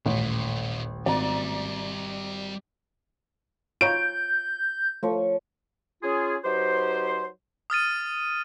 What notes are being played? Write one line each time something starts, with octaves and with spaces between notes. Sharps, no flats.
D#1 A1 A#2 A3
G#1 G3 D5 E5 A#5
F4 C#5 A#5 G6 D7
F3 A3 C#5
C#4 F4 G#4
F#3 D#4 G4 B4 C5
D#6 F6 A6 D#7